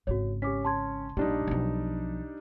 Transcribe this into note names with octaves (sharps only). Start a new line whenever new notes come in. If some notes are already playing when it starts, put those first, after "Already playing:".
G#1 C#3 F#4 C#5
C#4 G4 D6 B6
A5 C6 G#6
A#1 G3 D4 D#4
B1 F3